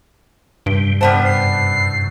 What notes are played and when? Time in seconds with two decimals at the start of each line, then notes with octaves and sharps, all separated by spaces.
0.66 G2 C3 G3
1.01 F#2 A2 C3 G3 B3 C5 A5
1.25 C7